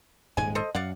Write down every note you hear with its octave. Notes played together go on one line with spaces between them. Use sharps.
D#1 G#2 G#3 G#5
A4 C5 D#5
F#2 D5 F5 F#5